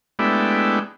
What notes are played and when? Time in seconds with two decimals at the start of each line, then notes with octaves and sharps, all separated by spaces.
0.19 G#3 A3 B3 D4 E4 G4